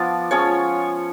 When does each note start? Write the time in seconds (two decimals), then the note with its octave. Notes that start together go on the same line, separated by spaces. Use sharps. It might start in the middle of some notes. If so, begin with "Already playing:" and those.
Already playing: F3 B3 D4 F4 D5
0.31 F3 G#3 C#4 F4 C#5